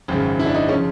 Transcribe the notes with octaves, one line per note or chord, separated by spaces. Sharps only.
G#1 F#2 C#3
E4
D4
D#4
C#4
C#3 F3